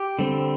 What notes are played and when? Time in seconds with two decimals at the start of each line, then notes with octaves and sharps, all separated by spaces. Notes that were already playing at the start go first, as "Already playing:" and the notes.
Already playing: G4
0.19 D3 G3 C4